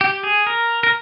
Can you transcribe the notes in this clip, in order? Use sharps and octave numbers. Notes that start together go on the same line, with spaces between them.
G4
G#4
A#4
A#4